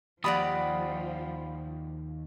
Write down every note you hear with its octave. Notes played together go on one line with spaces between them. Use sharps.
D#2 F3 G4 D5 F#5 B5 D#6